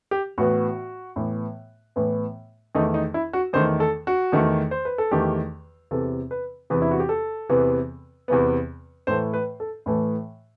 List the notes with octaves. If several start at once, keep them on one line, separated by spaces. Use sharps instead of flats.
G4
A2 E3 B3 F#4
A2 E3 B3
A2 E3 B3
E2 D#3 A3 D#4
D#4
E4
F#4
E2 D#3 A3 C5
A4
F#4
E2 D#3 A3
C5
B4
A4
E2 D#3 A3 G4
E2 C3 E3 B3 A4
B4
E2 C3 E3 B3 B4
E4
F#4
G4
A4
E2 C3 E3 B3
E2 C3 E3 B3
A2 E3 A3 C5
B4
A4
A2 E3 A3